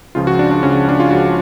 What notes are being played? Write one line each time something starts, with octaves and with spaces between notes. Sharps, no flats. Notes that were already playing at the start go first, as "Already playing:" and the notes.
C#2 C#3 F3 F4
F#4
D4
D4
C#2 C#3 F3 C#4
D4
F4
C#2 C#3 F3 F#4